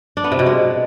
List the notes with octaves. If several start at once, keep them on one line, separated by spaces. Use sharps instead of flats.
D4
B3
C3
B2
G#3